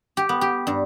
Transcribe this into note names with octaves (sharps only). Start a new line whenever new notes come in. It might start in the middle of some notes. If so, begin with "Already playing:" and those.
G4
B3
G4
G2